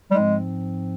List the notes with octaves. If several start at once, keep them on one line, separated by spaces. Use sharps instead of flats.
G3
G#2 F3 G#3 C4